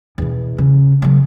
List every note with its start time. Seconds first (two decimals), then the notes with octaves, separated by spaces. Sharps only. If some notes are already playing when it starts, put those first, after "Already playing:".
0.18 E2 B2
0.58 C#3
1.02 C#3 F#3